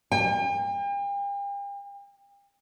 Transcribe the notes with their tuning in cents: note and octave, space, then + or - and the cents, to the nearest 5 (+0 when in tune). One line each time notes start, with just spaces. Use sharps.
G5 +40